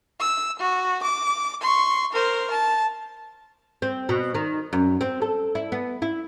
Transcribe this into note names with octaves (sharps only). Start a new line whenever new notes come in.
E6
F#4
D6
C6 C#6
A#4 C5
A5
C4
B2
D#3
F#2
C4
A4
E4
B3
E4